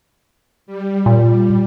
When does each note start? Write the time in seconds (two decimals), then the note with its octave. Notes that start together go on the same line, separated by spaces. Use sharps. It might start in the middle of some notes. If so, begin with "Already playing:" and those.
0.66 G3
1.06 A#2